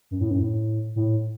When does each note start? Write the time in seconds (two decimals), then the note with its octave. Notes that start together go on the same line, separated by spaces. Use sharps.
0.11 F#2
0.21 A2
0.30 F#2
0.39 A2
0.96 A2